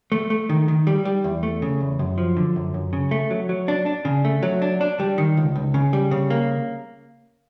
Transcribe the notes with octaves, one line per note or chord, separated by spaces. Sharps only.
A3
A3
D#3
D#3
G3
G3
E2
A3
C#3
E2
F#2
F3
D3
F#2
F#2
C#3
A3
F#3
F#3
D4
D4
C#3
A3
F#3
D4
D4
G3
D#3
C#2
C#2
C#3
G3
C#3
A#3